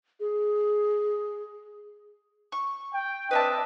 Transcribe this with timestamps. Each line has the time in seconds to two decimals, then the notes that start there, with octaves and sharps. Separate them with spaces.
0.20 G#4
2.52 C#6
2.94 G5
3.31 C4 D4 B4 D#5 E5 A5